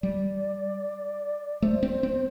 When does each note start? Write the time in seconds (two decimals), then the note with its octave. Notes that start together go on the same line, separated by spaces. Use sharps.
0.02 G3 D5
1.62 A3 C5
1.83 C4
2.03 C4